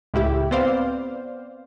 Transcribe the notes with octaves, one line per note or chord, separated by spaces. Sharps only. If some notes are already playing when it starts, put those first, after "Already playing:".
C#2 A2 E4 G4
B3 C4 C5 D5 F5